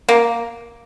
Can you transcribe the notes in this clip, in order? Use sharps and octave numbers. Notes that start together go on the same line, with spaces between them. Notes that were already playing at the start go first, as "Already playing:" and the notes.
A#3